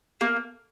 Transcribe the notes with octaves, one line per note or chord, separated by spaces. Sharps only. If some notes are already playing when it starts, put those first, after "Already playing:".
A#3